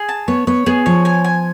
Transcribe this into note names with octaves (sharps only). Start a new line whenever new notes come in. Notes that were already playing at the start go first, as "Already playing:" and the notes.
Already playing: G#4
A5
B3 C#5
B3 C#5
B3 G#4
F3 C#5
G#5
G#5